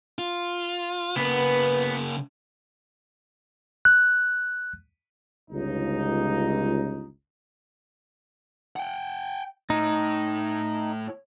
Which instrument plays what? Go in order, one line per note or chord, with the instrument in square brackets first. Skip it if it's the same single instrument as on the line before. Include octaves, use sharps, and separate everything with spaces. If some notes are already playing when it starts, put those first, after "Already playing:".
[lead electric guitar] F4
[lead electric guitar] C#3 A#3 [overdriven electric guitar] B3 [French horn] B4
[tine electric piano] F#6
[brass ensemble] G1 C#2 D#4
[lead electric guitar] F#5 G5
[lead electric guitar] A2 [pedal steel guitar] D#4